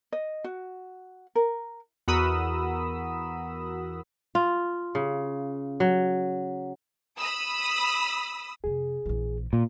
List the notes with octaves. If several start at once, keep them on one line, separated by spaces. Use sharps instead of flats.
D#5
F#4
A#4
E2 F#4 A#4 B5 D#6 E6
F4
C#3
F#3
B5 D#6 E6
F2 C3 G#4
A#1 E3
A#2